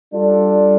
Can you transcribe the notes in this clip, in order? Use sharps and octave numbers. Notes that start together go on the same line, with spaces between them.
G3 D4 F4 A4